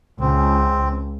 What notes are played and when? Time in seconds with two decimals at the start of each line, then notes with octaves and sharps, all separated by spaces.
0.20 C#2 C4